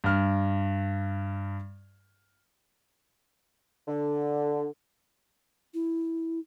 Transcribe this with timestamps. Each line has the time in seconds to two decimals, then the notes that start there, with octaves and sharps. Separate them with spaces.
0.04 G2 F6
3.88 D3
5.74 E4